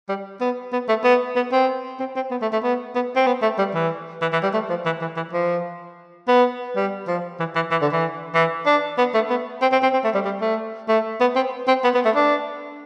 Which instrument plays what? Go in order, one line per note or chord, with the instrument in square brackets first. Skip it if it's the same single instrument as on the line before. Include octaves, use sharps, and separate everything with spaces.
[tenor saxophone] G3
B3
B3
A3
B3
B3
C4
C4
C4
B3
A3
A3
B3
B3
C4
B3
A3
G3
E3
E3
E3
G3
A3
F3
E3
E3
E3
F3
B3
G3
F3
E3
E3
E3
D3
E3
E3
D4
B3
A3
B3
C4
C4
C4
C4
A3
G3
G3
A3
A3
B3
C4
C4
B3
B3
A3
D4